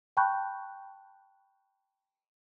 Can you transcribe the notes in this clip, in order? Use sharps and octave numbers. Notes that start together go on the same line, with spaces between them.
G5 A5 B5 C#6 F#6 G6